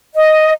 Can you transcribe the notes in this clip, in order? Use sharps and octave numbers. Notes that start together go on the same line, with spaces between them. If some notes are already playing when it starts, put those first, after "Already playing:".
D#5